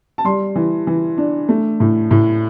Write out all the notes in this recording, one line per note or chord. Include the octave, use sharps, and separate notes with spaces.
A5
G3 C6
E3
E3
D4
A3
A2
A2